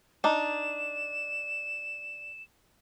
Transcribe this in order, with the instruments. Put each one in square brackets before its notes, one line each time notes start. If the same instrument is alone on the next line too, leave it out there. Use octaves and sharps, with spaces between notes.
[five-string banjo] D4 D#4 [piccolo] E7